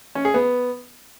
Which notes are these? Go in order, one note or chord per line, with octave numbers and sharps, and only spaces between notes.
C#4
G#4
B3